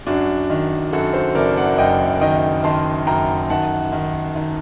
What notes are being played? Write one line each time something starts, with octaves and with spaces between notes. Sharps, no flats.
F#2 D4 F#4
D#3
F#2 F#4 A4
A4 C5
F#1 A#4 D5
D5 F#5
F#2 D#5 G5
D#3 D#5 G5
D#3 A5 C6
F#2 G5 A#5
D#3 F#5 A5
D#3
D#3